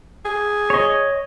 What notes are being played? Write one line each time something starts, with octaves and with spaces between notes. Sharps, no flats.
G#4
C#5 D#5